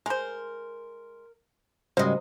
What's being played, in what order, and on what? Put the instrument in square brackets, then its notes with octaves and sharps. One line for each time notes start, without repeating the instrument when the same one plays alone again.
[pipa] G#3 C5 [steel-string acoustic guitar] A#4
[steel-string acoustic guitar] G#2 G#3 [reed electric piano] C#3 G3 F#4 [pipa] A#3 [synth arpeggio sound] C5 D#5